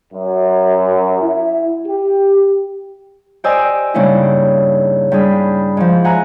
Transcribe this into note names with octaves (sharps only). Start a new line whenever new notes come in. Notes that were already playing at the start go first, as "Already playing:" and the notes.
F#2
E4
G4
G4 C5 D5 D#5 G#5 E6
G2 C#3 A#3 C#4 D#4 E4
G2 G#4 B5
G#2 F3
E5 F#5 G#5 A#5 F#6